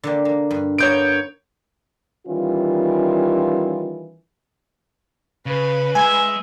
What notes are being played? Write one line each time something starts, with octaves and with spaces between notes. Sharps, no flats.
D3 A#3 G4
A#3
G2
A#3 B3 C#5 G6 D7
D#3 E3 G3 C#4 F4
C#3 B4
G#3 E5 G#5